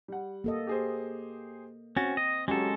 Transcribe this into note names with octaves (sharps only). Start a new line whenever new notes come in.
G3 F#5
A#3 A4 D#5
G4 G#4 C5
C4 C#4 F#4 A6
D#5
F#3 G#3 C#4 F#4 G4 A4